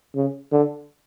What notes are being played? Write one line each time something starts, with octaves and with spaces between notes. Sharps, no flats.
C#3
D3